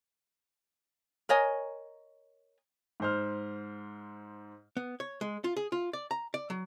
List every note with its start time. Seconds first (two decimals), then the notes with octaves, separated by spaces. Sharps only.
1.29 A#4 C#5 D#5 G#5
3.00 G#2 C5 F6
4.77 B3
5.00 C#5
5.21 G#3
5.44 F4
5.57 G#4
5.72 F4
5.93 D5
6.11 A#5
6.34 D5
6.50 F#3